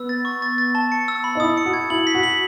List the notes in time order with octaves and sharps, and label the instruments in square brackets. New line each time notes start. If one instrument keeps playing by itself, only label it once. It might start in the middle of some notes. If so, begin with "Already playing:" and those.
Already playing: [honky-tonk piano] B3 [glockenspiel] E6
[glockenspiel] A6
C#6
A6
A6
A5
C#7
E6
B5
[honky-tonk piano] D#4
[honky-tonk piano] E4 [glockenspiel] D#6
[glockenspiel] C#7
[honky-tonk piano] F#4
[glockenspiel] G#6
[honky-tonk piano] E4 [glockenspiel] F#7
[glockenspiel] B6
[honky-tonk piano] F#4
[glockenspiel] F#7